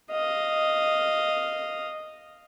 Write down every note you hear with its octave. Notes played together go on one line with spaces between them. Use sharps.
D#5 F5